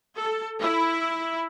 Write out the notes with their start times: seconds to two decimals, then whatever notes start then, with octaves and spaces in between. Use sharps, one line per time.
0.17 A4
0.60 E4